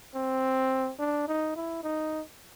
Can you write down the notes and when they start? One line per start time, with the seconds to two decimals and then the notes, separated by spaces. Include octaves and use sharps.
0.15 C4
0.99 D4
1.28 D#4
1.56 E4
1.84 D#4